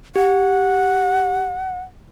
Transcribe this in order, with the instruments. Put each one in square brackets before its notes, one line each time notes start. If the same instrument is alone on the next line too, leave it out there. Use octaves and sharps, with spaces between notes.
[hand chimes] G4 [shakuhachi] F#5